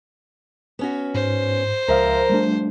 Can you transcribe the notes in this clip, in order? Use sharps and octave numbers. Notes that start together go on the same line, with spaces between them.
B3 C#4 F#4
G#2 C5
C#2 F3 A#4 E5 F5
G3 A3 D4